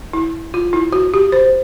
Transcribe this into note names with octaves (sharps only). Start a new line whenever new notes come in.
E4
F4
E4
F#4
G4
C5